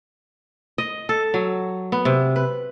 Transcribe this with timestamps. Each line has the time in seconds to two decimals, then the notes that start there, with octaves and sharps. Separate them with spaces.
0.78 D#5
1.09 A4
1.34 F#3
1.92 B3
2.05 C3
2.36 B4